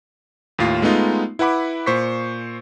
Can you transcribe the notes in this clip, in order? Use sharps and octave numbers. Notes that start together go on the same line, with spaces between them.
D#2 A2 F4 C7
G#3 A3 B3 D#4 F4
E4 B4 F#5 B5 D6
A#2 C5 C#6 B6